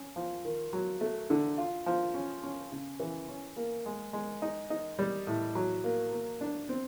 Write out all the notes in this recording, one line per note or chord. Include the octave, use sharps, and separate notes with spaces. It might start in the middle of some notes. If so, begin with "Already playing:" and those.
Already playing: C#4
F3
D#3
F#3
A3
D3
F4
F3
C#4
C#4
C#3
E3
C#4
A#3
G#3
G#3
D#4
D#4
G3
A2
F#3
A#3
A#3
D4
C4